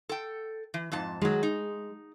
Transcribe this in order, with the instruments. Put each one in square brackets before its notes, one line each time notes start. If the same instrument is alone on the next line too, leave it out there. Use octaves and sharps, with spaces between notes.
[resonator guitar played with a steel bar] A4 G5
E3
F2 G#2 A5
[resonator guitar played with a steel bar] D#3 F#3 [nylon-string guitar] G#3
[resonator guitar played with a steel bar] D#4